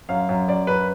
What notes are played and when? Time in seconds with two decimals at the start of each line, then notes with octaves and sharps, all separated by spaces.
0.09 F#2 F5
0.29 F#2
0.48 F#2 D5
0.67 F#2 B4